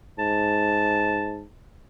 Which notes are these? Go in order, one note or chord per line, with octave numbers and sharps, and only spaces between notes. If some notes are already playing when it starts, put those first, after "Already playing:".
G#2 A5